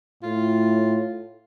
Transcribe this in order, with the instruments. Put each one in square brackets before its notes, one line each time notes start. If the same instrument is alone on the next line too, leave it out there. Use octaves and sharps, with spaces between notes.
[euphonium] A2 [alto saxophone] F4